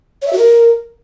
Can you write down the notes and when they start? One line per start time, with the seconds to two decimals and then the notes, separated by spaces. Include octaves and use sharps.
0.22 C#5
0.27 E5
0.33 F#4
0.38 A#4